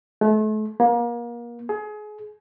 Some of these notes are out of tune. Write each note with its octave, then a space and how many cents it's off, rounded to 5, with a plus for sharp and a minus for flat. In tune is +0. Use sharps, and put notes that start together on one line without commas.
A3 -35
A#3 +30
G#4 +30